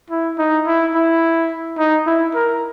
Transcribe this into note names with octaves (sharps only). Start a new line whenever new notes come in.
E4
D#4
E4
E4
D#4
E4
A#4